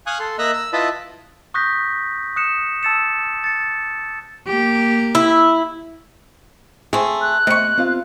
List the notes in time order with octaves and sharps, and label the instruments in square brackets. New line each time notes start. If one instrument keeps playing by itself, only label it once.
[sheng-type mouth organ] F5 G#5 C#6 D#6 F#6
A4 C6
A#3 D#5 E5 A#5 E6 F#6
E6
E4 F4 B4 D#5 A5 B5
[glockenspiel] C#6 D#6 F#6 G6 A#6 B6
D#6 F#6 C#7 E7
A5 E6 A6 C#7 E7
A6 C#7
[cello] A#3 G4
[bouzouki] E4
[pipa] A3 C4 [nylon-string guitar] G#4
[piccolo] F#6
[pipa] C3 C#6 [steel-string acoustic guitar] A3 [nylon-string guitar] D#5
[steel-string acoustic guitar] C4 F4 F5